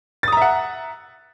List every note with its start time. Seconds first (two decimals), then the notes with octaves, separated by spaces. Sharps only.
0.23 A6
0.28 D#6
0.32 A#5
0.37 E5
0.42 F#5